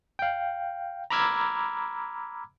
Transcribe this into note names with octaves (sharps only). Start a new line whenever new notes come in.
F5 G5
A#5 B5 D6 E6 F6 G#6